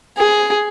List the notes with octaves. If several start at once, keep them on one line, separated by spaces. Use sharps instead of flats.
G#4